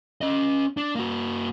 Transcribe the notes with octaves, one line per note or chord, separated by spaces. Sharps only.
C#4 D#5
D4
A#3 F#4